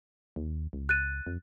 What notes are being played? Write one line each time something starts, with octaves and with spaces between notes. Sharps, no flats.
D#2
C#2
F#6 A6 D#7
F2